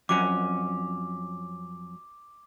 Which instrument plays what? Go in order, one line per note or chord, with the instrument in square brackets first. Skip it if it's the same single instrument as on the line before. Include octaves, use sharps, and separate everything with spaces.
[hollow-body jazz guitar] F2 F#3 C#4 [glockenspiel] D6